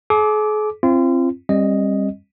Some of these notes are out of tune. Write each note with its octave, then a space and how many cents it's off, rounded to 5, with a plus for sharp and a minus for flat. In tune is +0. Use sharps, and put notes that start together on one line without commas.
G#4 +45 D6 +0
C4 +15 F4 -35
G3 +15 C4 +40 D#5 +0